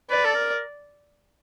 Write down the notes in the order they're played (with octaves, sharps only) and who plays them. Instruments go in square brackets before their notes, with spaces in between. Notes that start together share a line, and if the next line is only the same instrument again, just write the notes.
[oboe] B4 [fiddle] D5
[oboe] A4
A#4